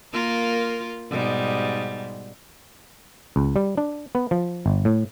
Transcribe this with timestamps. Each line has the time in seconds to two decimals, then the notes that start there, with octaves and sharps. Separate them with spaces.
0.13 A#3 F4 A#4
1.09 G#2 B2 G3
3.36 C#2
3.56 G3
3.77 D4
4.15 B3
4.31 F3
4.66 G1
4.85 A2